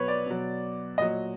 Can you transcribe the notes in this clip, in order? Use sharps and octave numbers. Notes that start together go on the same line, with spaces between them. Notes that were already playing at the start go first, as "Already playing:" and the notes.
Already playing: B2 F#3 B4 C#5
D5
B2 F#3
A#2 F#3 D#5